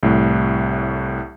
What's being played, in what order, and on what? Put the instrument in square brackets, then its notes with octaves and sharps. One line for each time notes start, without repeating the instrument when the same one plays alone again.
[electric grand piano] C2 A2